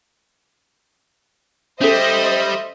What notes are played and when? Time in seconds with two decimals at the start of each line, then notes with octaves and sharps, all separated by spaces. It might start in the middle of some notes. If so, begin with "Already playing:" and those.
1.81 G3 C#4 A4 C5 D#5 E5